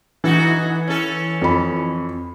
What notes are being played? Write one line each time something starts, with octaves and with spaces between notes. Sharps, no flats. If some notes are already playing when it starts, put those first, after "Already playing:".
E3 D#4 F#4 A4
C#4 A4
F2 B5